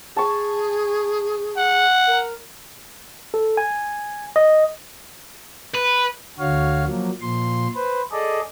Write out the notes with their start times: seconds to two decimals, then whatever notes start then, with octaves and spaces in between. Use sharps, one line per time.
0.17 G#4 A5 C#6
1.57 F#5
2.07 A#4
3.34 A4
3.57 G#5
4.36 D#5
5.75 B4
6.39 D2 D3 F#4 C#5 F5
6.86 F3 F#3 A#3
7.21 A#2 F3 C6
7.74 B4 C5
8.12 G#4 A4 D5 D#5